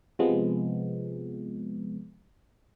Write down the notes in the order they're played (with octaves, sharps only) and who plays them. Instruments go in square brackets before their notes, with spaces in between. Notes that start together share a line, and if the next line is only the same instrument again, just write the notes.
[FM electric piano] C3 F3 G#3 B3